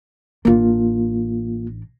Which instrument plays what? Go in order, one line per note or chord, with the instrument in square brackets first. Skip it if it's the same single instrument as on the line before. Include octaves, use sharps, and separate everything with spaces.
[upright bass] A1 D4 [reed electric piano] A#3 F4